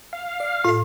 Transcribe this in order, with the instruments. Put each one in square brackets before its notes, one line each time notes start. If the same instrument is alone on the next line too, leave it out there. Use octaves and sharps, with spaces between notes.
[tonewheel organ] F5
[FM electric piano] D5
[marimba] A2 [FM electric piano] F4 A4